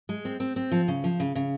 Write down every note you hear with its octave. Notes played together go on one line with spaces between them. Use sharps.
G#3
C4
C4
C4
F3
C#3
F3
C#3
C#3